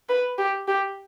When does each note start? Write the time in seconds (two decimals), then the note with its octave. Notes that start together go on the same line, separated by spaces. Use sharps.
0.09 B4
0.38 G4
0.68 G4